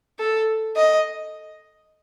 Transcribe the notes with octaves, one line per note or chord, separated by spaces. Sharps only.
A4
D#5